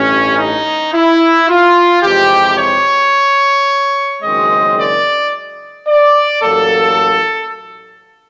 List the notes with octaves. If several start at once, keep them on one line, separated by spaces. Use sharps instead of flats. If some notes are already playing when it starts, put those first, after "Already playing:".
Already playing: A1 G2 E3 A3 C#4
D#4
E4
F4
F2 C3 E3 G#3 G4
C#5
F#1 F#2 D#3 G#3 C4 D#5
D5
D5
A1 A2 F#3 A#3 A4